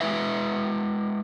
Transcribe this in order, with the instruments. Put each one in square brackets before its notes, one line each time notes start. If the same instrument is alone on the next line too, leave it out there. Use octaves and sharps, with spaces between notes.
[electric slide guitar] G#3 E4 B4 E5